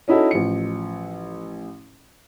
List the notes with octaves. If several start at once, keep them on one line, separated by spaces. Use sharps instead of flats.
C#4 D#4 E4 F#4 A4
A1 F3 C#7